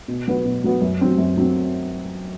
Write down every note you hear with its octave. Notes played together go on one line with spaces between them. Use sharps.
B2
F#3 B3 F#4 B4
B2
F#3 B3 F#4 B4
F#2
F#3 C4
F#2
F#3 C4